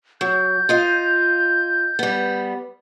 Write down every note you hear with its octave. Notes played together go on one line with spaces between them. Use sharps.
F#3 G6
F4 D#5 F5
G3 B3